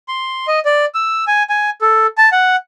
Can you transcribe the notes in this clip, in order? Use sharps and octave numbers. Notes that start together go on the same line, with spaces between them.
C6
D#5
D5
E6
G#5
G#5
A4
A5
F#5